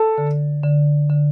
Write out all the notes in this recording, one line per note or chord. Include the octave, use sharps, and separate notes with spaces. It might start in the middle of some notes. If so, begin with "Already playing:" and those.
Already playing: A4
D3
D3
D3